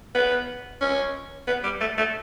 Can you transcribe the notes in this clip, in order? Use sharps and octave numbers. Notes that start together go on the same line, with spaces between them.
B3
C#4
B3
G3
A3
A3